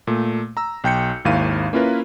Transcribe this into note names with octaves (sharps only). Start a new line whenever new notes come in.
A#2 A3
A#5 E6
B1 G5 G6 C#7
G#1 D#2 E4 F5 D#7
A#3 C#4 E4 F4 A#4 B4